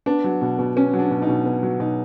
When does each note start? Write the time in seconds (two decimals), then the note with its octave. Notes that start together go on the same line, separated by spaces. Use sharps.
0.06 B3 D4
0.24 F#3
0.41 B2
0.59 B2
0.76 B3 C#4
0.93 F#3
0.99 D4
1.10 B2
1.22 D#4
1.28 B2
1.45 B3
1.63 F#3
1.80 B2 D#4